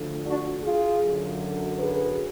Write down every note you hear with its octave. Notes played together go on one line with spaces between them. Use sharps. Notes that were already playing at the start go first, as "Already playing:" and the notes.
Already playing: D2 D3 F3
D4 F#4
F4 G#4
F#2 D3 F#3
G#4 B4